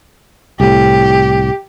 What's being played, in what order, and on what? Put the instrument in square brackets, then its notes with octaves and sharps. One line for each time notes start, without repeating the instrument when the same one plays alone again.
[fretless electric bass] C2 A2 [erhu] G4